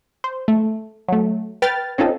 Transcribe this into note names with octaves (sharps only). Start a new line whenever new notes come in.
C5
A3
F#3 A3
B4 G5 F6 A6
C4 C#4 D#4 F4 A4